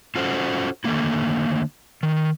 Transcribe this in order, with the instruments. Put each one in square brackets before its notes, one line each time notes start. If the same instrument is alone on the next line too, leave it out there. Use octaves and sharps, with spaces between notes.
[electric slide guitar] C#4 F4 F#4 A4 C5
D3 D#3 A3 A#3 E4
D#3